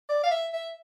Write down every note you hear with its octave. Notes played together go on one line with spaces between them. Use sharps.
D5
F5
E5
E5